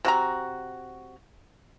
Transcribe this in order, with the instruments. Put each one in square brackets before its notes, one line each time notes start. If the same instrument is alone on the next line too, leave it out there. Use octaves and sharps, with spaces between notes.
[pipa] C3 F#4 A#5